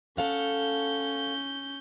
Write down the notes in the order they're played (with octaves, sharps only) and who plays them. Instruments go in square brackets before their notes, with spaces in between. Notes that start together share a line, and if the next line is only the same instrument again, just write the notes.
[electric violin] C#4 G6 [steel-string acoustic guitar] A4 F5 F#5